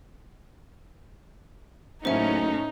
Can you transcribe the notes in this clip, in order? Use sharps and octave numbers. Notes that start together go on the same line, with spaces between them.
F#1 A2 A3 C#4 D#4 C5 E5